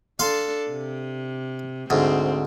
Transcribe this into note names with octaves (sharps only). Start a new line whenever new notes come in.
D4 A4 F5 C6
C3
D2 G#2 C4